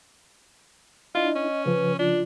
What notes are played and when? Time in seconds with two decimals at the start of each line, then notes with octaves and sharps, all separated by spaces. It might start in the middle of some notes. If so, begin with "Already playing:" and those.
1.15 D4 E4 F4 D#5
1.35 C#4
1.66 C#3 F3 B4
1.99 D4 F4